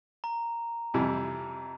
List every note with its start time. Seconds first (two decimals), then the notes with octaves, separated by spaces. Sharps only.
0.24 A#5
0.94 F2 C3 E3 G3